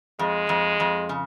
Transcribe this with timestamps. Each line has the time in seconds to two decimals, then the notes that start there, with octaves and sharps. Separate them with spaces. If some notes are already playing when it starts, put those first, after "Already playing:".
0.19 F2 G#3
0.49 F2
0.80 F2
1.09 C#3